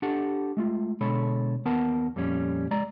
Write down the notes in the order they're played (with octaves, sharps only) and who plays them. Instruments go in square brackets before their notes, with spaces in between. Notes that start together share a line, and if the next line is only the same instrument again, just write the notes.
[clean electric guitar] D4 G4 A4 F#5
G#3 A3 F4
B2 D3 G#3 A4 C#5 B5
D#2 B3 A#4 F#5 A5
F2 A#2 G3 C#4
G#3 D5 A#5